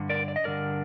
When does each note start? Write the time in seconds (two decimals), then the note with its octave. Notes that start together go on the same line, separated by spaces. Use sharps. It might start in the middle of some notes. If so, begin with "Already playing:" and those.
Already playing: G2 D3
0.09 A#4 D5
0.28 D5
0.36 D#5
0.44 G2 D3 A#4 D5